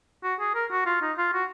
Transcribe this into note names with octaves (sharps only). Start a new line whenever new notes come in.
F#4
G#4
A#4
F#4
F4
D#4
F4
F#4